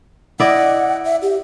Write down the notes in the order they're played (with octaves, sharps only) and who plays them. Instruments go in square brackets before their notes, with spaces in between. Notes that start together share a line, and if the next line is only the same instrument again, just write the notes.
[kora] E4 D5 D#5 [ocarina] F#5
[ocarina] E5
G4